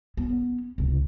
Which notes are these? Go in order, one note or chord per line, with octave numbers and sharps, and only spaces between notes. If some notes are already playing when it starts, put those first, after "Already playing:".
B3 C#4
C#2 C3